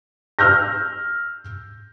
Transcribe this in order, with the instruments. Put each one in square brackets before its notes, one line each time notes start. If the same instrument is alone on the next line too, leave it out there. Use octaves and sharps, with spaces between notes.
[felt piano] E6 F6 G6 A#6